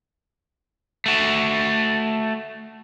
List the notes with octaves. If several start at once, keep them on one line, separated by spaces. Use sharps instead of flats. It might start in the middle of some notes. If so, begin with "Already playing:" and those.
A3 F#4